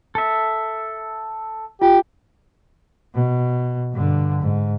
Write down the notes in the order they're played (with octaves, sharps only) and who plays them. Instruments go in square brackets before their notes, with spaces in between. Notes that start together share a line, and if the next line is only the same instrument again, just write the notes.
[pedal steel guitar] A4 E5
[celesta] F4 [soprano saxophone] G4
[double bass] B2
G2 D3
G#2